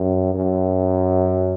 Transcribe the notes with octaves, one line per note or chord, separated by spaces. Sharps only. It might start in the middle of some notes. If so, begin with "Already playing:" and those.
Already playing: F#2
F#2